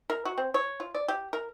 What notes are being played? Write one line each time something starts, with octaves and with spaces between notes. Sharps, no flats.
A#4
F#4
C4
C#5
F4
D5
G4
A#4